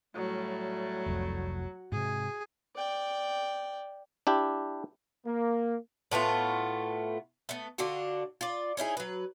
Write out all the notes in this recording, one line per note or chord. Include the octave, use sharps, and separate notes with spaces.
A2 F#3 G3 A3
F1 C2 F2
G#2 C3 G#4
D5 G5
D4 E4 G4
A#3
A2 A3 B3 F4
A3 B3
D3 D4 F4 F#4
F4 D5
C#4 D#4 E4 G#4
F#3 B4